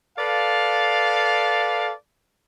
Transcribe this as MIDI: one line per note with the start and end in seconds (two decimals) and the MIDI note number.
0.18 1.92 69
0.18 1.92 71
0.18 1.92 74
0.18 1.92 77